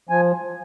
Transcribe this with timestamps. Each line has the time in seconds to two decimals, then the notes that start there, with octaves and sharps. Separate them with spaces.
0.09 F3 G#5